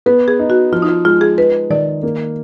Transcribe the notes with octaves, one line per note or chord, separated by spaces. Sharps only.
B3 B4
G#4
D#4
F#4
F3 F4
D#4
F4
G#3 F4
G#4
D#4 B4
D#3 D5
A#3